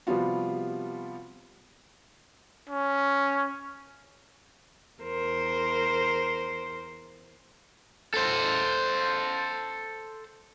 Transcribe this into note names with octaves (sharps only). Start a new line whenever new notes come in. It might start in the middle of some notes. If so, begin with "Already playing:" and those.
C3 F3 G3 B3 F4 F#4
C#4
E2 A#4 C5
A4 C5